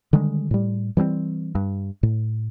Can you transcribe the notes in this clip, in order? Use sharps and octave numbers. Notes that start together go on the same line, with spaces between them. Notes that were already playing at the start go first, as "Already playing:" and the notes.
D3 D#3 G3 G#3
A2 G3
E3 G3 A3 C4
G2
A2